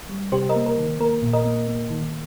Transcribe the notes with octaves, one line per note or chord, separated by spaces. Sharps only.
G3
C3 G4 C5
A#4 D#5
A#3
A#4
D#3
A#3 A#4
A#2
A#4 D#5
A#3
A#3
D#3